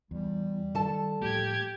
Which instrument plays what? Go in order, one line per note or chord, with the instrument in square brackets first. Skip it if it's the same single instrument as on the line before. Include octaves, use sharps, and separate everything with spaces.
[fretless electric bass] E2 [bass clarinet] G3
[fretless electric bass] D#3 [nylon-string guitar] A4 A5
[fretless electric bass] A2 F3 A#3 [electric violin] G4 G#6